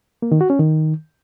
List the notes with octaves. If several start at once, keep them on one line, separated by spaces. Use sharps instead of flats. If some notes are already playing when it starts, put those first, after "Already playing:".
A#3
D#3
F#4
C#4
D#3